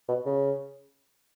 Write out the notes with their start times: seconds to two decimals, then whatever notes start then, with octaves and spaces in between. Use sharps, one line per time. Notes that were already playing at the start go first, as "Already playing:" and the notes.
0.09 B2
0.26 C#3